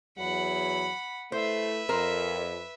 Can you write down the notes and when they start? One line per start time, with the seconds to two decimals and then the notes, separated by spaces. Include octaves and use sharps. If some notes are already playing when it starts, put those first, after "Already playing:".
0.18 E2 F#3 F#5 B5
1.32 A3 E4 B4 C5 E5
1.89 F2 A#4 C5